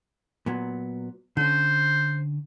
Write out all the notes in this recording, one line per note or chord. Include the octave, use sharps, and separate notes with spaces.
A#2 F#3 B3
D3 C#4 C5